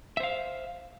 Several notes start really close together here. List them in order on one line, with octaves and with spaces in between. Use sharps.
E5 C5 F5